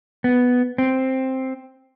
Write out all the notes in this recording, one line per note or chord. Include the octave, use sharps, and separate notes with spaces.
B3
C4